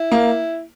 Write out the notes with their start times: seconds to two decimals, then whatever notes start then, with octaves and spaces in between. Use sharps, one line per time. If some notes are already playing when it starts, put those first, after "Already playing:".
Already playing: E4
0.12 A#3